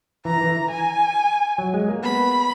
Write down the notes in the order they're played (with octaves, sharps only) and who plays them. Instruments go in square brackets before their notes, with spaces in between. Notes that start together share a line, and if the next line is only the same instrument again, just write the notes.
[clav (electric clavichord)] E3 [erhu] A#5
[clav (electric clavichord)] E3
[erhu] G#5
[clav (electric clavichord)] F#3
G#3
A#3
[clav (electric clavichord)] B3 [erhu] B5